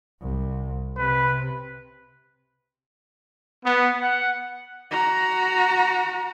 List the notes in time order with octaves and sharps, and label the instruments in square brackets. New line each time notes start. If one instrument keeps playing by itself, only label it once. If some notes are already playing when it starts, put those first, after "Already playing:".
[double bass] C2
[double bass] C3 [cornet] B4
[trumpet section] B3
F#5
[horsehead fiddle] F#4 A#5